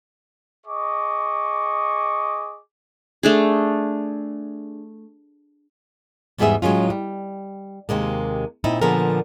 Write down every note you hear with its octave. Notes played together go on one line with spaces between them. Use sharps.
G#4 D#5 C#6 D6
A3 D4 G#4
E2 G#2 G3 B3 G#4 E5
A2 F#3 G#3 C#4 F4
G3
D#2 C3 G#3 A#3
A#2 C4 D#4 E4
A#2 D3 F3 B3 G#4 A#4